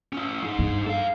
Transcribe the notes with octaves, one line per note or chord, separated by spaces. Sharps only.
C#4 E4
G#3 D#4
G2
A4 F5